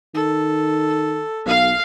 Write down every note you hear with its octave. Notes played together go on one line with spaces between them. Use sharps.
D#3 A4
B1 F5